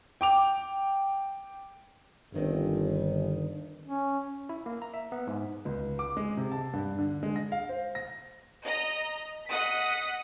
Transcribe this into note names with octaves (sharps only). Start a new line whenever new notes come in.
G5 D6 F7
G1 G2 D#3 C4
C#4
E4
A#3
A#5
E5
B3
G#2
C#2
D6
G#3
C3
A5
G2
D3
G#3
A#6
F5
C5
A#6
D#5 A#5
D#5 F#5 D#6 B6